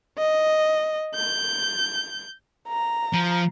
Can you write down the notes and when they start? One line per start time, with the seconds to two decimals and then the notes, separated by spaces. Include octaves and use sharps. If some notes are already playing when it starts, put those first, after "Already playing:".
0.18 D#5
1.15 G6
2.68 A#5
3.13 F3